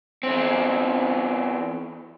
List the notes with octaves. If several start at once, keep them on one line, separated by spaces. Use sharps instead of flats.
E2 C4